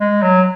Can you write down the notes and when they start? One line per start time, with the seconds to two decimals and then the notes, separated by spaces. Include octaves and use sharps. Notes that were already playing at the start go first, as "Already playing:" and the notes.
0.01 G#3
0.23 F#3